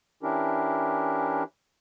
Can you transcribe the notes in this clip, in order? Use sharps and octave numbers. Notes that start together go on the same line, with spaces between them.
E3 C#4 D4 E4 G4 A#4